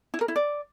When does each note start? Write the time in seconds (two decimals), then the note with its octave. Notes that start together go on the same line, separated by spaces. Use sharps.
0.14 E4
0.21 A#4
0.28 E4
0.36 D5